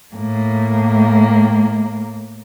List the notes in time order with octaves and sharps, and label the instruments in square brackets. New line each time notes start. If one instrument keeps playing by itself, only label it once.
[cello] A2 A#3